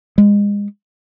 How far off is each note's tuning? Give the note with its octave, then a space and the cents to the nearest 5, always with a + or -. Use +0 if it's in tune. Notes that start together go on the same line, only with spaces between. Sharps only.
G#3 -30